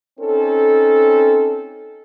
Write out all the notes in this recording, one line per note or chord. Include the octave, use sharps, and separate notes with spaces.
C4 C#4 D#4 A4